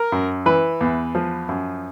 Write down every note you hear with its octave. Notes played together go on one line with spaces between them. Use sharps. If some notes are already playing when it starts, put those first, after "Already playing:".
Already playing: A#4
F#2
E3 B4
E2
F3
F#2